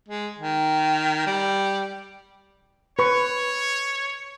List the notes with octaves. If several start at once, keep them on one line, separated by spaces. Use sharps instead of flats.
G#3
D#3
G3
B4 C#5 C#6